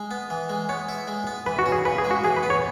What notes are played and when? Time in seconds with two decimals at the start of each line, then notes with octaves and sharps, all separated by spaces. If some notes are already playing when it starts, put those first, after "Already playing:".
Already playing: G#3
0.11 B3
0.30 E3
0.49 G#3
0.69 B3 C#5
0.89 E4
1.08 G#3
1.27 B3
1.46 E3 B4
1.59 F#4
1.66 C#4
1.72 G#4
1.85 C#3 B4
1.98 G#4
2.04 G#3
2.11 F#4
2.24 E3 G#4
2.36 B4
2.43 B3
2.50 C#5